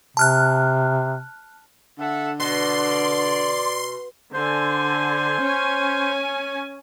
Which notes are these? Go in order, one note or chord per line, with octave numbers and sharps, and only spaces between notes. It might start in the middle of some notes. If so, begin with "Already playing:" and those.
C3 A5 F6 F#6
D3 A4 E5 F#5
B2 D5 C6
D3 C5 G#5
C#4 G#5